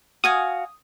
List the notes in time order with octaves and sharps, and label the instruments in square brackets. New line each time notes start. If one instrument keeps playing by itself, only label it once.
[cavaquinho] F#4 F5 G#5 [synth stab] D#6